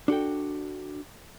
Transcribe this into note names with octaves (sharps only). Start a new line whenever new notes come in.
D4 F#4 A4 G5